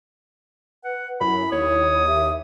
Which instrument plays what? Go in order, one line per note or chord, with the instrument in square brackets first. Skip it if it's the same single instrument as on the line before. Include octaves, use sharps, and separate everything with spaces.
[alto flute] B4 [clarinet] F#5
[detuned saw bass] F#2 [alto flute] E4 [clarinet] B5
[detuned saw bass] D#2 [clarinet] C#5 [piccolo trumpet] D#6
[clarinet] G4 [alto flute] E5